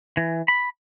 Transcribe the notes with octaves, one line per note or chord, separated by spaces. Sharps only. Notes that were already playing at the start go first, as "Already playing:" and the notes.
E3
B5